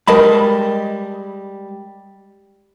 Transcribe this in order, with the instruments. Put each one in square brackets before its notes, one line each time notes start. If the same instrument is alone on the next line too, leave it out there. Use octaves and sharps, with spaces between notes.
[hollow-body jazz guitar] G3 G#3 A5 [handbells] A#4 D#5 B5